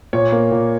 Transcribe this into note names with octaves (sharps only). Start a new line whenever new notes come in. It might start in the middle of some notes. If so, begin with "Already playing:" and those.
A#2 C#5
A#3
A#2